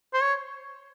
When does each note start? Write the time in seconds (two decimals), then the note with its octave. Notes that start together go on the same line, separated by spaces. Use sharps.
0.14 C5
0.22 C#5